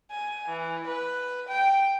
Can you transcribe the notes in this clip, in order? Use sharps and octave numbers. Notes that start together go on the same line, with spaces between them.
G#5
E3
B4
G5